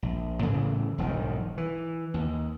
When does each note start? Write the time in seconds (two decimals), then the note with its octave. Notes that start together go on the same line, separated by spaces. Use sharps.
0.02 A#1
0.43 A2 C#3 E3 A3
0.98 E1 B1 G#2 D#3
1.58 E3
2.14 D#2